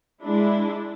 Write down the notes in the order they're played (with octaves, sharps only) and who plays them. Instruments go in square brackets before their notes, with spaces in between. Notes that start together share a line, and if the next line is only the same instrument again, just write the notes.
[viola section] G#3 D4 E4